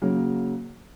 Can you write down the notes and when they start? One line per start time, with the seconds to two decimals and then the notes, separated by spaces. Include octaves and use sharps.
0.01 C#3 F#3 A#3